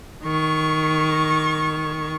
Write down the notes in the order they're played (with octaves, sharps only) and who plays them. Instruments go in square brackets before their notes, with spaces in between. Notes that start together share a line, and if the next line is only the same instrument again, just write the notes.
[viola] D#3 C#6